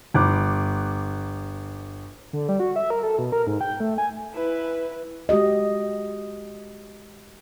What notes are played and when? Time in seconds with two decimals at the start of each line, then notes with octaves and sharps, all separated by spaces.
0.14 G1 D6 F#6
2.33 D3
2.49 G3
2.60 F#4
2.76 E5
2.90 A#4
3.03 A4
3.19 B2
3.32 A#4
3.47 G#2
3.61 G5
3.80 A3
3.98 G#5
4.34 E4 B4
5.29 G#3 F#4 G4 D#5